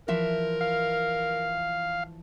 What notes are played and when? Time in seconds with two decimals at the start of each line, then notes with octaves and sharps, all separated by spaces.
0.08 E3 F3 A#4 E5
0.61 F5